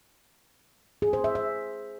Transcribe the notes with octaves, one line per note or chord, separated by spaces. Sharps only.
G#4
C5
E5
E5